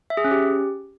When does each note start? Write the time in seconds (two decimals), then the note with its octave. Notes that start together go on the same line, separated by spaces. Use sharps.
0.10 E5
0.17 G#4
0.24 C#4
0.31 G4